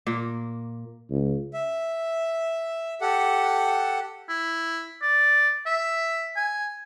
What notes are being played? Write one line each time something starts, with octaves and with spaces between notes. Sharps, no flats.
A#2 A#3
C#2
E5
G4 A4 F#5
E4
D5
E5
G#5